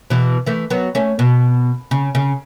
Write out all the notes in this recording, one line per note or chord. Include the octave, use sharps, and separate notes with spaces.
B2 E3
E3 A3
F#3 B3
A3 C#4
B2
C#3
C#3